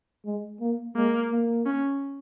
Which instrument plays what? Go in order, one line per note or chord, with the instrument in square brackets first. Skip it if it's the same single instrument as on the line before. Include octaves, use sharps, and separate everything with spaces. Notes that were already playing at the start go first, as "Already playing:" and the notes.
[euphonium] G#3
A#3
[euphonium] G#3 [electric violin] A#3
[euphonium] A#3
[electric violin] C#4